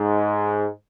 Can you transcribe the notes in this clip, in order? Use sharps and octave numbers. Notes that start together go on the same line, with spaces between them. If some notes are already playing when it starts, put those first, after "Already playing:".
Already playing: G#2